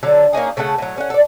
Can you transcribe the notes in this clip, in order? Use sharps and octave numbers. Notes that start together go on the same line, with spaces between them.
D3 F#3 A4
A#3 C#4 D#4 G#4
C#3 A3 A4 F#5
A2 F#3
C#4 F#5
A4 D5